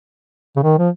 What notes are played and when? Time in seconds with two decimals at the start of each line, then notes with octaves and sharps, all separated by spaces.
0.56 C#3
0.63 D#3
0.78 F3